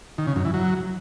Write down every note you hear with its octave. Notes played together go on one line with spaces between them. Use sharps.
D#3
C#3
F#2
E3
F#3